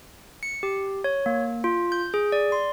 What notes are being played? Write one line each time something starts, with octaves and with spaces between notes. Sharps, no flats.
C#7
G4
C#5
A#3
F4
G6
G#4
D5
C6